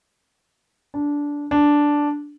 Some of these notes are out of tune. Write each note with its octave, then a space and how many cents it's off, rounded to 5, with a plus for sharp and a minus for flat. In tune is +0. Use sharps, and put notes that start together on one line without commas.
D4 -15
D4 -5